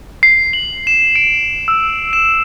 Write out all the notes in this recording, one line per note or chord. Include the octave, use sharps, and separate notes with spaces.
C7
F#7
E7
D7
E6
E7